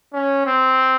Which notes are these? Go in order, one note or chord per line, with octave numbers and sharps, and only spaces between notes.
C#4
C4